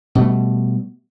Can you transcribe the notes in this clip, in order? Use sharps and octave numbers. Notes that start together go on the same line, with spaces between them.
B2 G3 A3